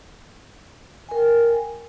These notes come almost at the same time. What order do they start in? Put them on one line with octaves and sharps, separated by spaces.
G#5 A#4 G5